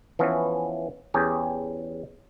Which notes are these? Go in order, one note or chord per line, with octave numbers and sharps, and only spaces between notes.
E3 F3 B3 C#4 E4
E2 C#4 G4 G#4 G5